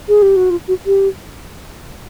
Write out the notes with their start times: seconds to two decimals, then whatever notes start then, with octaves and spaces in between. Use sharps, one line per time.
0.08 G#4
0.22 G4
0.36 F#4
0.50 F4
0.68 F#4
0.86 G4